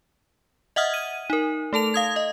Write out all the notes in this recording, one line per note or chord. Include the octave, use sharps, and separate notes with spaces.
D#5 E5 F#5 D#6 F6 G#6
D#7
D#4 A#4
A3 A4 A5 F7
F5 D#6 G#6
D#5